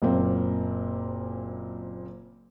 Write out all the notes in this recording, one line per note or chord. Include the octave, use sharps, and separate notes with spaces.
F#1 A#2 A#3 C4